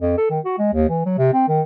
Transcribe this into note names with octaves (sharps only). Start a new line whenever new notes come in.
F2
A4
D#3
F#4
G#3
D#2
E3
F#3
C3
C4
D#3